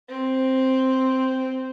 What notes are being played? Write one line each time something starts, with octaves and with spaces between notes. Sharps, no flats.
C4